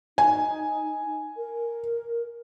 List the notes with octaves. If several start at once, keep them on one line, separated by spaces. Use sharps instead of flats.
D#4 G#5
A#4